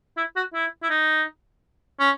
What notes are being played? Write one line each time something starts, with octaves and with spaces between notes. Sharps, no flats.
E4
F#4
E4
E4
D#4
C#4